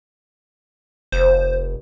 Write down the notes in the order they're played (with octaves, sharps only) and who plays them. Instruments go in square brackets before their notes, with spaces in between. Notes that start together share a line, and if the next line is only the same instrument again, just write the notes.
[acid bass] F1 [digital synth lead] C5